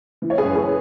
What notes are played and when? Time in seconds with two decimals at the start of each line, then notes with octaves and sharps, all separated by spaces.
0.22 E3
0.30 C#5
0.38 G#4 B4
0.44 F#2
0.55 G#4 B4